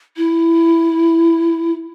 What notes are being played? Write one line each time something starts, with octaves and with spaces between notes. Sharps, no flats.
E4